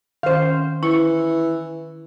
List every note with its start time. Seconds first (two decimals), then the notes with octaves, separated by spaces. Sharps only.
0.23 D#3 C#4 C5 F5
0.83 E3 E4 C#6